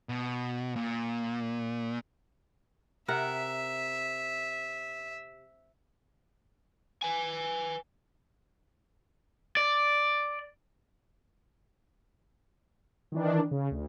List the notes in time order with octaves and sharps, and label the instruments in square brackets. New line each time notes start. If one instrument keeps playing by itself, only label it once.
[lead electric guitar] B2
A#2
[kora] C3 A#4 F#5 [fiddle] E5
[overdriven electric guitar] B4 G#5
D5
[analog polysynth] D#3 E3 D4
C#3
D2